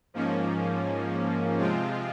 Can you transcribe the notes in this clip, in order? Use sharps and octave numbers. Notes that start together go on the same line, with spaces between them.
G#2 F3 A#3 C#4
C3 F3 G#3 C4 F4